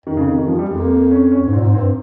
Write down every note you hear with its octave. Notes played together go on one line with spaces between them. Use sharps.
F2 D#3
C#3
D#3
D#3
F3
G3
F2 G#3
A#3
A#3
C#4
C#4
G#2
A#2 C4
G#2
G2 C4